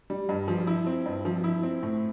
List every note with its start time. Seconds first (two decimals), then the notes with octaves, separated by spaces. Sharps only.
0.10 G3
0.29 G2
0.48 F3
0.67 E4
0.87 C4
1.06 G2
1.25 F3
1.44 E4
1.63 C4
1.83 A2